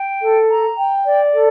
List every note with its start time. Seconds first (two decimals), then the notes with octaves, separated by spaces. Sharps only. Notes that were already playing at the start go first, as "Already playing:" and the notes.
Already playing: G5
0.21 A4
0.49 A#5
0.77 G5
1.05 D5
1.34 A4